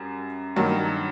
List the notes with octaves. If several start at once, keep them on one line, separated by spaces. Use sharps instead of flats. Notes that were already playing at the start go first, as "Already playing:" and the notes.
Already playing: F#2 G3
G2 D#3 F#3 A#3